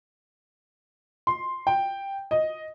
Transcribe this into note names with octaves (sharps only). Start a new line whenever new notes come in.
C6
G5
D#5